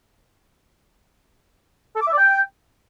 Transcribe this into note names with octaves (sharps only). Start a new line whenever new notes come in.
A4
D6
E5
D5
G5